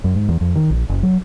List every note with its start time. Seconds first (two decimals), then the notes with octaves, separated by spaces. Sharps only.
0.04 F#2
0.15 G#2
0.29 E2
0.41 F2
0.55 D#3
0.70 A#1
0.89 F#1
1.03 F#3